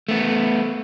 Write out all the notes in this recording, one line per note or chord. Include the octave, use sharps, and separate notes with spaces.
A3 B3